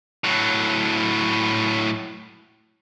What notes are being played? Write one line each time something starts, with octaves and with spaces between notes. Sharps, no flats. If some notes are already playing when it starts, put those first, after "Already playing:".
A2 F#3